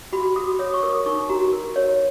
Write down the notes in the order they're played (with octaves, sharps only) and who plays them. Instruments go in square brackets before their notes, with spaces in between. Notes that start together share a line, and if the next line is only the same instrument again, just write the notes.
[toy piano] F#4 B5
F#4 D#6
C#5 D#6
C#6
A#4 D#6
D#4 C#6
F#4 A#5
A#4
C#5